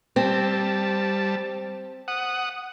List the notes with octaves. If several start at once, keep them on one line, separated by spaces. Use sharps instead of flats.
G3 C4 A5
F#5 D#6